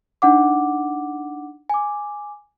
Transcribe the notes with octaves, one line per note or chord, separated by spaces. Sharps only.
D4 D#4 F#5 D6
G#5 D6